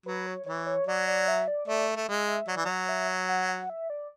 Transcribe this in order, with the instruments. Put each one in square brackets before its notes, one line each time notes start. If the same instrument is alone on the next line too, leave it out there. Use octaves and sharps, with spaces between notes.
[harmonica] F#3 [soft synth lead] B4
[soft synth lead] C#5
[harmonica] E3 [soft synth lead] C#5
[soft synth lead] C#5
[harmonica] F#3 [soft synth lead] D5
[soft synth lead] D5
E5
D5
[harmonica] A3 [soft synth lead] D5
[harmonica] A3
[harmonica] G#3 [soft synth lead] E5
[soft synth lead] E5
[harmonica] F#3 [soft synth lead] D5
[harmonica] E3
[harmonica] F#3 [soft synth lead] C#5
[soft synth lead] E5
F#5
F#5
E5
D5